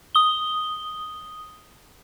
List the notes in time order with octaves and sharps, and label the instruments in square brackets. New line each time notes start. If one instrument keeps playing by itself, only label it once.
[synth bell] D#6 G7